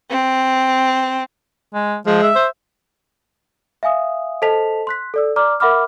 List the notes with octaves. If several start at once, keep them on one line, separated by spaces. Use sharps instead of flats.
C4
G#3
F3 G#3
E5
C5
E5 F5 G#5 D#6
A4 C5 D#5 A5 B6 F7
C6 F#6 B6
A4 D5 E6
D5 A#5 D6 F6
A#4 E5 F#5 B5 D6 F6